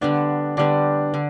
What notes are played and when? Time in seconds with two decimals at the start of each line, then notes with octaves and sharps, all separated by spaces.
0.01 D3 G3 B3 D4 D5
0.57 D3 G3 B3 D4 D5
1.14 D3